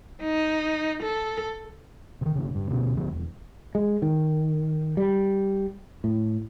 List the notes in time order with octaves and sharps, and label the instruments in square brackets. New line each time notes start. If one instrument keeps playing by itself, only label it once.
[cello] D#4
A4
[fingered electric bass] C3 D#3
G1 C#3
G2
D2 B2 C#4
D2 F3
E1
[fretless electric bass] G#3
D#3
G3
A2